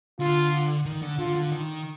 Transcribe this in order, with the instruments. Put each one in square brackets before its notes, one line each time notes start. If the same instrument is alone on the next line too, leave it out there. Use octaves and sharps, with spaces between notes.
[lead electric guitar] D3 [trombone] F4
[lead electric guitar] D#3
D3
[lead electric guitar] D3 [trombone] F4
[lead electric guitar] D3
D#3